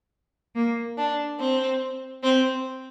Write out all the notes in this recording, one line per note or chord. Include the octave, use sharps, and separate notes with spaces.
A#3
D4
C4
C4